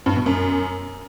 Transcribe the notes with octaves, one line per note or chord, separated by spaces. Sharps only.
G2
B2
F#2